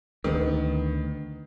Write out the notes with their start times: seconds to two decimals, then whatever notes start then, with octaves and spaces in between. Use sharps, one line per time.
0.24 D2 D#3 B3